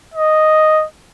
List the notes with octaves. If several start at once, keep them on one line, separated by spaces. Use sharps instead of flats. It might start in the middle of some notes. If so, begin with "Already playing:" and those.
D#5